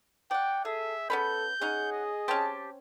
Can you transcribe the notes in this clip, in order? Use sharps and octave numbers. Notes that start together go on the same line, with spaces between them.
D5 F#5 G5
G#4 A4 E5
B3 C#4 A4 B5 G6
C#4 D#4 G#4 F#5
D#5
C4 C#4 G4 A5